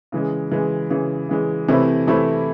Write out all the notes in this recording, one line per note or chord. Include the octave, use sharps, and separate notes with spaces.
C#3 E3 G#3
C#3 E3 G#3
C#3 E3 G#3
C#3 E3 G#3
C3 E3 A3 C4 E4
C3 E3 A3 C4 E4